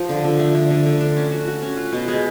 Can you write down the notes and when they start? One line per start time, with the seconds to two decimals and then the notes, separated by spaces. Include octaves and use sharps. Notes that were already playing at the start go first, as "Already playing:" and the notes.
Already playing: F3
0.09 D3
0.24 D3
0.39 A3
0.55 D3
0.70 D3
0.86 D3
1.01 D4
1.17 C#4
1.32 F#4
1.47 F#4
1.62 C#4
1.77 F4
1.93 B2
2.08 G#3